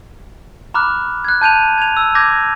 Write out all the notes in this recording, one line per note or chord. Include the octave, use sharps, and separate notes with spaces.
A#5 B5 D6 F6 F#6
F#6 G#6
A5 G6 D#7 F7
G#6 F7
E6
D6 G6 G#6 A#6